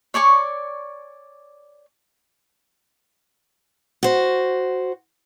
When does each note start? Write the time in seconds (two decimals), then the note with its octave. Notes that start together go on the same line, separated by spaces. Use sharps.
0.14 C#5 D5 G#5 C#6
4.03 F#4 C5